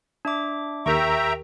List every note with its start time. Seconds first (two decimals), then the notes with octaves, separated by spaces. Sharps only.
0.25 D4 E5 D6
0.86 D#2 G4 A#4 E5 G5 A#5 C#6